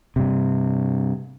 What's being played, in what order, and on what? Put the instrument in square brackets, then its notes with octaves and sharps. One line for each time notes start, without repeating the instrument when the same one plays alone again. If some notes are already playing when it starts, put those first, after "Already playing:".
[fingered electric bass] G2 C3